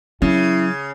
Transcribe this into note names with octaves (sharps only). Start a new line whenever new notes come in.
C#3 F#3 C#4 E4